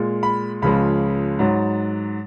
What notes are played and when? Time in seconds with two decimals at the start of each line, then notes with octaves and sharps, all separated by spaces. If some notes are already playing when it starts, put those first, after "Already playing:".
Already playing: A#2 G#3
0.23 B5
0.62 C#2 C#3 F3 G#3 B5
1.39 G#2 F#3